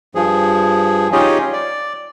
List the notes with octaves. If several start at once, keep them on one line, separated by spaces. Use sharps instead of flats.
G2 F3 G#4
C#4 D#4 F4 G4 G#4 D#5
D5